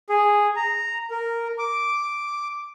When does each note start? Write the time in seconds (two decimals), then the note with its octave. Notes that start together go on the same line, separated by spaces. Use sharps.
0.09 G#4
0.56 A#5
1.11 A#4
1.59 D6